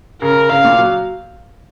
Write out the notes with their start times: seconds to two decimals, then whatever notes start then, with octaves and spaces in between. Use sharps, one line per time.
0.22 C#3 A#4
0.50 C#3 F5
0.64 A#2
0.78 F#3